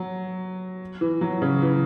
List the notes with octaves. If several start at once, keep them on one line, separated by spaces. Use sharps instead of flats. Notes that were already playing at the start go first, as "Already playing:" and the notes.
Already playing: F#3
E3
F#3
C#3
E3